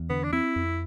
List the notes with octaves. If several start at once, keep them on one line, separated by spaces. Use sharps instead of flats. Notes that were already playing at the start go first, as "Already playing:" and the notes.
Already playing: E2
D3 B3
D4
C4 E4
F2